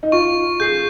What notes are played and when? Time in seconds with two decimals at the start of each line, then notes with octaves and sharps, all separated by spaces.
0.03 D#4
0.12 F4 C#6
0.60 G#4 G6 C7